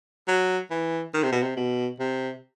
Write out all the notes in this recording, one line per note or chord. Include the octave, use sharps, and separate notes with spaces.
F#3
E3
D#3
C3
B2
C3
B2
C3